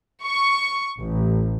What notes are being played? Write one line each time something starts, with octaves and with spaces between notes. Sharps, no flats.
C#6
A1